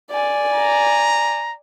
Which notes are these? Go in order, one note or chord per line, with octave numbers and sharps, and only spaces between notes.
D5 G#5
A#5